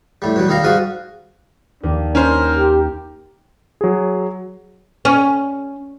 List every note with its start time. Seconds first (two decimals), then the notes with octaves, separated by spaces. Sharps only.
0.22 A2 G3
0.36 B2 F#3 G3
0.48 D#3 G3 D#4 F5 A#5
0.64 G#2 G3 F#4 F5 D#6
1.83 D#2 D4
2.15 C#4 A#4 C5
2.57 G4
3.81 F#3 G#4
5.05 C#4